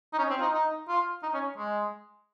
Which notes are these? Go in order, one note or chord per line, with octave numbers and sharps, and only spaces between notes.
D#4
C#4
C4
F4
D#4
D#4
F4
D#4
C#4
G#3